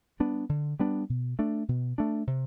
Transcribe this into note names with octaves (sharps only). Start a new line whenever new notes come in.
G3 B3 D4
D3
G3 B3 D4
B2
A3 D4
B2
A3 D4
C3